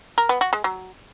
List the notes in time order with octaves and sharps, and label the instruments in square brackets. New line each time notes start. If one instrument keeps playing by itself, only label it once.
[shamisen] A#4
B3
F#4
G#3
F#3